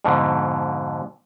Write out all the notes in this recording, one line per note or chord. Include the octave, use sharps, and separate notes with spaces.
F2 G#2 B2 D3